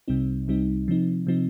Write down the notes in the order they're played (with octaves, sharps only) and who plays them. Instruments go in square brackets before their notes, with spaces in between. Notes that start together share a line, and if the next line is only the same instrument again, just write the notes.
[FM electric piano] C2 C3 G3 C4 D#4
C2 C3 G3 C4 D#4
C3 F3 C4 D#4
C3 F3 C4 D#4